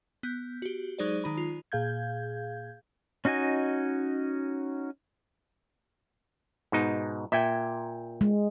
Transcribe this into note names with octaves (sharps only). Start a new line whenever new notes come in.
B3 G6
F#4 G4
F#3 G#3 D#4 G#4 C5 D5
D#3 D#4 B5
F4
A#2 G#4 F5 G6 G#6
C#4 D#4 F#4 D#5 G#5
G#2 B2 D#4
A#2 E5 G5 G#6
G#3